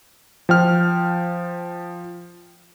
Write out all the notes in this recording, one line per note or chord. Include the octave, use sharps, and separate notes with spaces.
F3 G5 F6